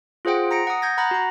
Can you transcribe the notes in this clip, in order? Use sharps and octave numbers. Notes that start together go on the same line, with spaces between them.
F4 G#4 C5 F#5 G5
A#5 A#6 C#7 D7
F#5 D#6
G6 G#6 A#6
F#5 A#5 B5 F#6 A6 A#6
F#4 A#5